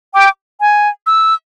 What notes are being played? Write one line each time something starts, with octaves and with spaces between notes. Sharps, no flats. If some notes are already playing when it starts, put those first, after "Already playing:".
G5 D6
G#5
E6